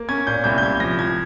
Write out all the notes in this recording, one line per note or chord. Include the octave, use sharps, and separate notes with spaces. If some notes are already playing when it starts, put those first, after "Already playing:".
Already playing: A#3
C#4 G#6
A#2 G6
C2 G6
G6
C2 G#6
F3 A#6
C2 G#6